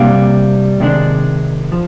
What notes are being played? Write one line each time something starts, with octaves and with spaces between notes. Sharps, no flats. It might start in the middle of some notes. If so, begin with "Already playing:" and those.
Already playing: C3 G3 A#3 D4 F5
C3 D#3 G#3 D4
F3